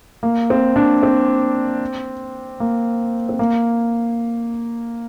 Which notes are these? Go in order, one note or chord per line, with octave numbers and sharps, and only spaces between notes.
A#3
C4
D4
C4
A#3
C4
A#3